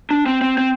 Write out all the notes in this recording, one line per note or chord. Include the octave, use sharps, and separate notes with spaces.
D4
C4
C4
C4